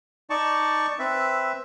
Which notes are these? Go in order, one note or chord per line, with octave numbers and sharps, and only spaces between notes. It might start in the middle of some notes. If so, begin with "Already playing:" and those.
D#4 D5 A5 C#6
C4 B4 E5